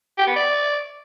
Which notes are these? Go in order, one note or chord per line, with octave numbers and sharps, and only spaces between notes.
G4
B3
D5